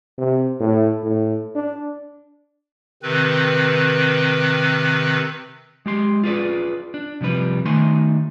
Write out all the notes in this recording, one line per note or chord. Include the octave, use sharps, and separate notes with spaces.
C3
A2
A2
D4
C3 D#3 C4 B4
G#3 G4 C6
F4 G#4 B4 D5
D4
C3 F3 G3 B4
D#3 A3 D#4 G#5 C6